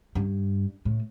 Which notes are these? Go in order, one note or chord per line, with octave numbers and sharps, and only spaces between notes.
G2
A2